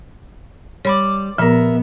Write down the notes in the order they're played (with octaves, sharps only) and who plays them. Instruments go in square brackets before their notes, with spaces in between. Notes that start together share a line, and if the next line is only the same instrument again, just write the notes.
[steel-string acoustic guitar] G3 [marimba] C#5 B5 [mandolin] D5 C6
[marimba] A#2 F3 [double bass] B3 [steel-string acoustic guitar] A#4 E5